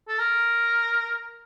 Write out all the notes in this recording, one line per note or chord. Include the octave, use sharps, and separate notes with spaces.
A4
A#4